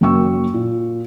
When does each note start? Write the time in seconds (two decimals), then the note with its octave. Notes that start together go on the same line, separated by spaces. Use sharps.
0.01 F#1 F#2 A#3 G5 C#6 E6
0.54 A#2